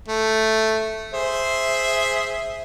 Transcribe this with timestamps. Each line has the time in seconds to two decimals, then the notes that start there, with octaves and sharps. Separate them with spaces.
0.08 A3
1.14 G#4 C5 E5